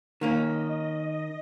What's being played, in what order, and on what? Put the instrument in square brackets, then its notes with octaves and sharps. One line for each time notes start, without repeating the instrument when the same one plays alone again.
[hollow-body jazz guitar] D#3 A#3 C#4 [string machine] D#5